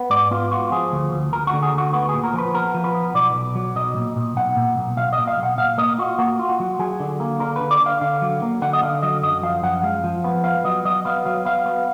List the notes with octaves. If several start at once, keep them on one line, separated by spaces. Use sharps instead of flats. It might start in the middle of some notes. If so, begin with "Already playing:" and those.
Already playing: B3
G#2 D5
B3 F4
F4 F#4
F3 G#4
D2
D2
D2 A#4
F#4
D3
G#4
D2 F#4
B3 F#4
A#2 G#4
A#4
F3 B4
B3 A#4
F3
B4
B3
B1 D5
B1
F#3
B1 D#5
A#2
A#2
B1 F#5
A#2
B1
B1 F5
D#5
A#2
F5
B1 F#5
A#2 F5
A#3 D#5
F4 F#4
A#3 F#4
F4
F#4
F#3
F#3 G#4
D3
A#3
D3 A#4
D3 B4
D5
D3
F5
D3 F5
F#3
A#3
D3 F#5
D#5
D3 F5
F#3 D#5
F#2 D#5
F3 F5
F#2 F#5
G#3 F5
F3
B3
B3 F5
F#3 D#5
F#3 D#5
B3 F5
F#3 F5
B3 F5
B3